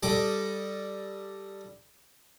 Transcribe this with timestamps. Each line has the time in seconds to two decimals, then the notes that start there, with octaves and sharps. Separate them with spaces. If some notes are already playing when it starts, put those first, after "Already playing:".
0.03 G3 A4 D#5 D6